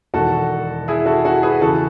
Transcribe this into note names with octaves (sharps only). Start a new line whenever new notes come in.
E1 E2 D#3 F#4 A4
E4 G#4
F#4 A4
F#4 A4
G#4 B4
C#3 E3 F#4 A4